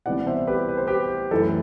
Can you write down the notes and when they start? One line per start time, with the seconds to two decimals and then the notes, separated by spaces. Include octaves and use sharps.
0.06 C2 C3 E3 B3 D5 F#5
0.27 C5 E5
0.47 G4 B4
0.69 B4
0.78 C5
0.87 G4 B4
1.31 F#2 E3 A3 A4